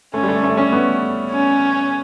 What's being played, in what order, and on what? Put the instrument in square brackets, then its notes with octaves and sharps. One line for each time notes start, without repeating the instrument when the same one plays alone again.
[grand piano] A3 [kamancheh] C#4
[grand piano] G3
A3
A3
C#4
B3
[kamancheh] C#4